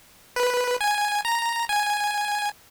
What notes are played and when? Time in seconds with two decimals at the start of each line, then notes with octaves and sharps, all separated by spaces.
0.36 B4
0.81 G#5
1.25 A#5
1.69 G#5